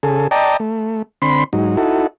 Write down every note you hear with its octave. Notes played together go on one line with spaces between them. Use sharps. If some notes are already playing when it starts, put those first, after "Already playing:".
C#3 G#4 A4
D5 D#5 G5 A5 A#5
A3
D3 C4 B5 C6
G#2 F#3 D#4
D#4 E4 F#4 A4